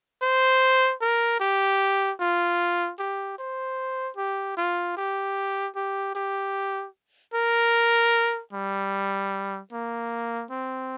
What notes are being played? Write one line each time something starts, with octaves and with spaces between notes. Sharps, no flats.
C5
A#4
G4
F4
G4
C5
G4
F4
G4
G4
G4
A#4
G3
A#3
C4